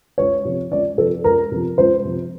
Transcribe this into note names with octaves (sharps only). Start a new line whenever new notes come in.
C#2 C#5
C3 F3
C#2 D5
C3 F3 A4
C#2 A#4
C3 F3
C#2 C5
C3 F3